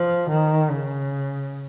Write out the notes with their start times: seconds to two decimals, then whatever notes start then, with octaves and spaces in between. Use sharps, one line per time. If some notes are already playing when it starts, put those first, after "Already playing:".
Already playing: F3
0.30 D#3
0.71 C#3